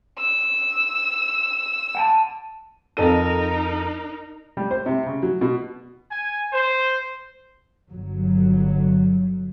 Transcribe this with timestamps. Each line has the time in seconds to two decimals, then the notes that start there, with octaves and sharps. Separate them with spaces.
0.19 E6
1.95 F#5 G5 A5
2.97 F2 D#4 A4 A#4 D#7
4.57 G3
4.71 C5
4.86 C3
5.06 C#3
5.23 F#3
5.41 B2
6.11 G#5
6.53 C5
7.90 G1 F#3